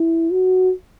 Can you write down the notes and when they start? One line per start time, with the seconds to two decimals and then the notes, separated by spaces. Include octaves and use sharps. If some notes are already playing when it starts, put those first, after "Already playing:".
Already playing: E4
0.31 F#4